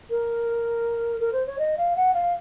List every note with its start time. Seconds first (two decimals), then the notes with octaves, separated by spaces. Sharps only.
0.10 A#4
1.20 A#4
1.33 C5
1.47 C#5
1.59 D#5
1.78 F5
1.96 F#5
2.14 F5